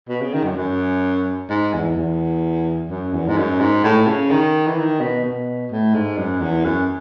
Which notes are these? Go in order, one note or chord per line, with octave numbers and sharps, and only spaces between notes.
B2
C#3
D#3
F#2
F#2
G#2
E2
E2
F#2
E2
G#2
F#2
G#2
A2
C#3
D#3
E3
D#3
B2
B2
A2
G#2
F#2
E2
F#2